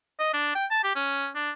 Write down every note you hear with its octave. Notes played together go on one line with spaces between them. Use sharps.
D#5
D4
G5
A5
G4
C#4
D4